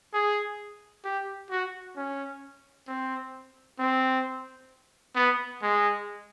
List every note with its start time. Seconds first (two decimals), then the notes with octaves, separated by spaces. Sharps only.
0.14 G#4
1.04 G4
1.51 F#4
1.96 C#4
2.88 C4
3.79 C4
5.16 B3
5.62 G#3